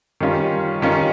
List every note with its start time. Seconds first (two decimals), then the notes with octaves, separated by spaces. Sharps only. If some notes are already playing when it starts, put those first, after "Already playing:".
0.21 D#3 G3 C#4 F4
0.82 D#3 G3 C#4 F4